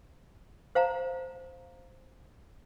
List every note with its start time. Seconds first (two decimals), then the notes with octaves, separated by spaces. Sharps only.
0.75 C5 F5 A5 A#5